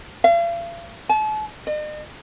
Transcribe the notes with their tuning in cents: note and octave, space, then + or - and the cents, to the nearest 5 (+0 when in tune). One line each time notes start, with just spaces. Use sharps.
F5 -45
A5 -40
D#5 -45